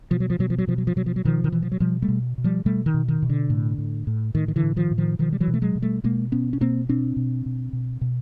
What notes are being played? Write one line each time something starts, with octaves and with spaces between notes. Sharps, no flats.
B2 F3
F#3
F3
B2 F#3
F3
F#3
B2 F3
F#3
F3
B2 F#3
F3
F#3
B2 D#3 F3
D#3
B2 E3
F3
F#3
B2 F3 G3
G3 A3
B2
B2
F3 G3
B2 G3 A3
D#3
B2
D#3
B2
D3
A2
A2
A2
A2 D#3
D#3
D3 E3
A2
D#3 F3
A2
D#3 F3
B2 D#3 F3
G3
E3 F#3
B2
A3
F#3 G#3
B2
G3 A3
B2 G#3 A#3
B2 B3 C#4
C#4
B2 A#3 C4
B2 C4 D4
B2
B2
B2
B2